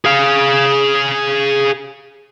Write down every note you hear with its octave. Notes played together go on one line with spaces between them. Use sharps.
G#4 F5